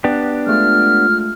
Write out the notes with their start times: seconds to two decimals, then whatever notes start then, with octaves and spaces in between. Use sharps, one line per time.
0.04 B3 D4 G4
0.47 G#3 A3 F4 F6